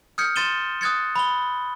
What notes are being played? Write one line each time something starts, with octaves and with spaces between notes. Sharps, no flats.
D#6 F6 G6 G#6 C#7
C6 A6 D#7 E7 G7
D#6 F#6 G#6 A6 C#7
B5 G7